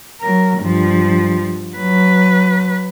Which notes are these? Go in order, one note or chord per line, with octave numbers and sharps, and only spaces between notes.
F#3 A#4
G2 F3
F#3 B4